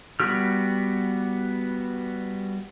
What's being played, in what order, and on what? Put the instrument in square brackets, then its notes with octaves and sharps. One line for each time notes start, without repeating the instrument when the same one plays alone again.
[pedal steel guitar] G3 B3 F#4 G4 F6